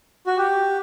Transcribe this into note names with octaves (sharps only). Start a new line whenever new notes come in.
F#4
G4